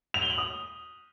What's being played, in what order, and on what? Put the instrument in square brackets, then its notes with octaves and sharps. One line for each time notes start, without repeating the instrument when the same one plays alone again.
[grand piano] F7
G7
F#7
D#6